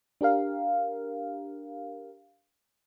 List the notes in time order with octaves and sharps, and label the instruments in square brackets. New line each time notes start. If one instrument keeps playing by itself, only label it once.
[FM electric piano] D4 G4 A#4 F5